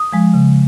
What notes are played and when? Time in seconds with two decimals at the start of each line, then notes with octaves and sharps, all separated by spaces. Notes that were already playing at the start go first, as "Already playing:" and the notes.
Already playing: D#6
0.12 F3 G#3
0.34 C#3